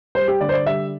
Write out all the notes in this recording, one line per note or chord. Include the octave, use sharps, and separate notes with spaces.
G3 C5
G4
D3 D5
C5
D5
G3 E5